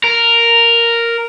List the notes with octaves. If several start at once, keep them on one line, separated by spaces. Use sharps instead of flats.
A#4